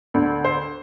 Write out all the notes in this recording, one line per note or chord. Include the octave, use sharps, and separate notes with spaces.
D2 D3
C5